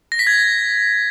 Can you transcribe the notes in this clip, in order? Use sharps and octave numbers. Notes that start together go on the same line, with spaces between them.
A#6
B6
G#6